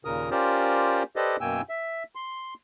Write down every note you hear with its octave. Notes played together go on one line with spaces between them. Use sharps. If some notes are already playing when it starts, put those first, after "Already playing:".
D#2 A#2 C#3 A#4 D#6
C#4 F4 G4 A#4 C5 D5
G4 A4 B4 C5 D5 D#5
F#2 B2 A#3 G5 G#5 E6
E5
C6